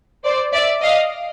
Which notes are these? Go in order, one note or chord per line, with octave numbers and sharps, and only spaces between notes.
C5 D5
D5 E5
D#5 F5